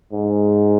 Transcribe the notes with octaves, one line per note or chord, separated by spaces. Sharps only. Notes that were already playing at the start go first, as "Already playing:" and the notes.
G#2